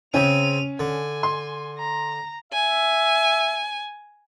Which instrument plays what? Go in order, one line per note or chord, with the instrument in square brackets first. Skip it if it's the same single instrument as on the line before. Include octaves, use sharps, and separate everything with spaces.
[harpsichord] C#3 C4 [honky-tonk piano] C#4 [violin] D#7 F7
[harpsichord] D3 [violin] G#5
[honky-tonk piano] C6
[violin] A#5
[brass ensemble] E5 [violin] G#5